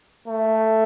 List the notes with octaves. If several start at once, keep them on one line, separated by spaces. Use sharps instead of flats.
A3